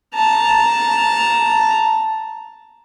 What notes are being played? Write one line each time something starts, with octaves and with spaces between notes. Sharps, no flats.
A5 A#5